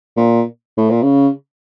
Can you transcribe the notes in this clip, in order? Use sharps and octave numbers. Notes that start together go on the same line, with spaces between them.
A#2
A2
A#2
C#3